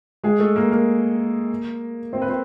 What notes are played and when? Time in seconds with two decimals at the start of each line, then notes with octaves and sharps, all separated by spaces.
0.24 G#3 G#4
0.40 A3 A4
0.56 A#3 A#4
0.71 A#3 A#4
2.13 C4 C5
2.22 B4
2.29 C4 C5